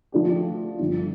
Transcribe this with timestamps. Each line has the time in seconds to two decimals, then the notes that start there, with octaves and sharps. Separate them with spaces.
0.12 D3 F3 A3 D4 G4
0.80 G1 G2 F3